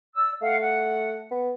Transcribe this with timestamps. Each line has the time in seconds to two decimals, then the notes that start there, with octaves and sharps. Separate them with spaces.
0.15 D5 E6
0.42 A3 F5 F#5
0.61 F#5
1.31 B3